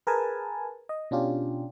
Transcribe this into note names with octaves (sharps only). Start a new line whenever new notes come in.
G#4 A#4 B4 G#5 A5
D#5
B2 C#4 D4 F4 G4